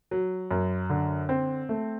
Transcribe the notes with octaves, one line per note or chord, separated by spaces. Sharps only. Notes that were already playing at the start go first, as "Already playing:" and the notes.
F#3
F#2
D3
C4
A3